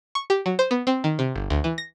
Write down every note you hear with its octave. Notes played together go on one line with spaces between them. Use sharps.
C#6
G4
F#3
C5
B3
C4
D#3
C3
G1
D2
E3
A#6